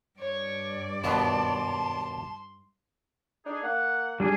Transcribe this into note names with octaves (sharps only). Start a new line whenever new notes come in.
G2 C#5 D5
D#2 B2 B3 A5 C6
D4 D#4 G#4
A#3 F#5
G3 D4 G#4